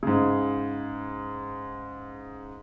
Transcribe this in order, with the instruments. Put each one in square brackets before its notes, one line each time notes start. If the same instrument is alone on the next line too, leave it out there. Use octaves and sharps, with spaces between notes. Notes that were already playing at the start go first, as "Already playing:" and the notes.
[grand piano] G#2 C#3